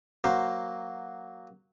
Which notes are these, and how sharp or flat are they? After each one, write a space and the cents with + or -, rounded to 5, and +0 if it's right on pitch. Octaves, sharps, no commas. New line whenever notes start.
F#3 +0 A#3 +0 C5 +0